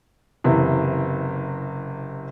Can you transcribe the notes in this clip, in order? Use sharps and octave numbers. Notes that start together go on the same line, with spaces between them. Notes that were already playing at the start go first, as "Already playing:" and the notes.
F#1 C3 E3